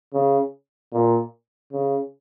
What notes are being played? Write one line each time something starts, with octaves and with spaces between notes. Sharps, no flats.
C#3
A#2
C#3